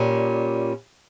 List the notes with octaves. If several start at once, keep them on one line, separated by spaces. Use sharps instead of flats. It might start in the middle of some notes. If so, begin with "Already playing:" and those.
Already playing: A#2 G3 C#4